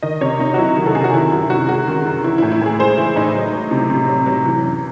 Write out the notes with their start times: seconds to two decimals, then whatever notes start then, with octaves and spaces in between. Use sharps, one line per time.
0.03 D#3 D#5
0.21 C3 C#5
0.39 C3 D#4
0.54 F#4
0.58 F#3 E4
0.77 D#3
0.86 A4
0.95 C3 G#4
1.04 F#4
1.13 D#3 E4
1.32 F#2 E4
1.50 F#2 F#4
1.68 G#3 F#4
1.87 D#3
2.06 F#2
2.24 E3 E4
2.38 A2 E4
2.52 E4
2.61 A2 G#4
2.79 G#3 C5
2.98 E3 E4
3.16 A2 D#4
3.35 F#3
3.53 F#3
3.71 C3
3.90 C3
4.08 F#3
4.26 F#3
4.46 E3
4.64 F#2